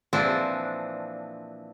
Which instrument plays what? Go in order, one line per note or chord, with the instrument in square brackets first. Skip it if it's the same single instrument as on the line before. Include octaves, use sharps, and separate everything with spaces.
[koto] A#2 E3 F3 C4 D4